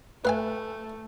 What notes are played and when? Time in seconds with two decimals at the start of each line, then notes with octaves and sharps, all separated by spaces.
0.25 A3 B4 F5 G#5